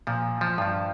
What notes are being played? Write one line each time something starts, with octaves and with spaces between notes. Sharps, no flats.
A#2 F3
F3
G2 F3